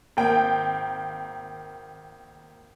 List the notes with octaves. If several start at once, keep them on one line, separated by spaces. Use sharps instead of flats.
G#1 A#3 G5